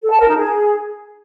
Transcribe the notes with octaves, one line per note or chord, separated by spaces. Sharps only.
A4
A5
A#4
D#4
G#4